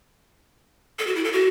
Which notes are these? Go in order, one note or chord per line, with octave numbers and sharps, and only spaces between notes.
A4
F#4
E4
A4
F#4